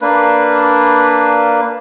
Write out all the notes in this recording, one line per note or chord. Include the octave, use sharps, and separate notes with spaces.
A#3 D4 B4